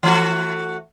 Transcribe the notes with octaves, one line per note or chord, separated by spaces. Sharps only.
E3 A3 F#4